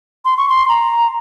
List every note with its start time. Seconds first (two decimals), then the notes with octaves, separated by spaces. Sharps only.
0.25 C6
0.38 C#6
0.49 C6
0.69 A#5